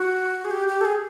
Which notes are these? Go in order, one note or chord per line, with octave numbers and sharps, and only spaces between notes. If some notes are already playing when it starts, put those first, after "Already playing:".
Already playing: F#4
G#4
G4
G4
A4
G#4